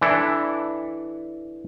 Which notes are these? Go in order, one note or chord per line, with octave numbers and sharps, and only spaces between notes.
E3 D4 E4 A4